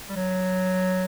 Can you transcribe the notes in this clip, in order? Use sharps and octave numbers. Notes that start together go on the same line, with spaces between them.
G3
F#3